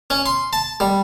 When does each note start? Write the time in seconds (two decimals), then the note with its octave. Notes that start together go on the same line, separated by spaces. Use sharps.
0.10 C#4
0.26 C6
0.53 A5
0.80 G3